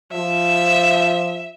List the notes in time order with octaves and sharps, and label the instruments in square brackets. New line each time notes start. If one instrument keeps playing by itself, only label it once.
[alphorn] F3 [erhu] E5